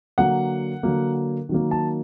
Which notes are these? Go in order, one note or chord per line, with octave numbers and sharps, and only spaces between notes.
D3 F#3 A#3 F#5
D3 F#3 A#3
D#3 F#3 A#3
A5